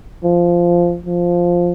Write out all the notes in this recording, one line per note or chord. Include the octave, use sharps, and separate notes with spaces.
F3
F3